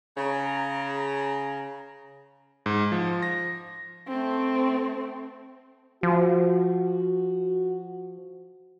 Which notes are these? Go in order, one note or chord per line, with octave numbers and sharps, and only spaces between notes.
C#3 A#5
G#2
F3
A#6
A3 C4
F3 F#4